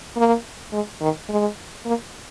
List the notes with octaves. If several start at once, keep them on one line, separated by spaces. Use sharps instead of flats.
A#3
G#3
D#3
G#3
A#3